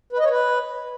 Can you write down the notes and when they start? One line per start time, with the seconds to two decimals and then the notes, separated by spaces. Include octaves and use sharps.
0.13 B4
0.18 D#5
0.24 C#5
0.30 B4